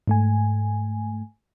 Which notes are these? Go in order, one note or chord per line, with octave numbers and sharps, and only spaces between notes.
G#2 A3 G#5